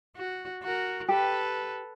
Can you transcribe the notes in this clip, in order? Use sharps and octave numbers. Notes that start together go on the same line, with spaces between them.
F#4
F#4 A#4
G4 A4 B4